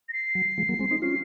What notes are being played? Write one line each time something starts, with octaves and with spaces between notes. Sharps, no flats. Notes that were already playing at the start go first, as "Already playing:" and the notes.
A#6
C7
F#3
F3 G#3
F#3 A#3
G#3 C4
C4 D#4
C#4 F4 C7